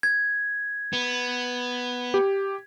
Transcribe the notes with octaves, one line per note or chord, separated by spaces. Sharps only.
G#6
B3
G4